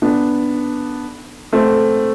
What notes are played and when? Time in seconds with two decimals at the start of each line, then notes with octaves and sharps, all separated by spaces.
0.02 B3 D4
1.53 A3 C4